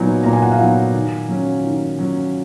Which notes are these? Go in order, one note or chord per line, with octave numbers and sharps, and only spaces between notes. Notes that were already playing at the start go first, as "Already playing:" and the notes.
Already playing: A#2 F#3 B3 D#4 G#5
A#2 A#5
G#5
F#5
F5 G#5
F#3 B3 D#4
D#3
F#3 C#4
D#3
F#3 C#4